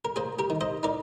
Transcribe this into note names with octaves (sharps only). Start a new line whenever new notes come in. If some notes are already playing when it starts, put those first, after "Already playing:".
A#4
A#3 G#4 C5
G4 A#4
D#3
C5 D#5
D#4 A#4 D5